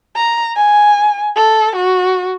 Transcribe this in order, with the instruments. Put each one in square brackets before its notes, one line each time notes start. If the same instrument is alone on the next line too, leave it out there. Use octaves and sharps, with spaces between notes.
[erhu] A#5
G#5
A4
F#4